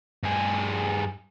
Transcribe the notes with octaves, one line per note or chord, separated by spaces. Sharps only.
G2 G#4